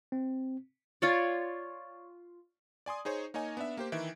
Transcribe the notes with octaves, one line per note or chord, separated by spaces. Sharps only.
C4
F4 C#5 D5
D5 G#5 C6 D#6
D#4 G#4 C5 C#5
A#3 D#4 C#5 D#5 G#5
B3 D4 E5
A#3 G4 C5
D#3 E3 E5 D7